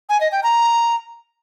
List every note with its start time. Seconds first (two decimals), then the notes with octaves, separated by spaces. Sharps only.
0.09 G#5
0.21 D#5
0.32 G5
0.43 A#5